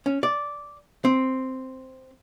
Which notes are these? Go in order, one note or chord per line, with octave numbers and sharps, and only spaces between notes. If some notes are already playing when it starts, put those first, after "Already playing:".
C#4
D5
C4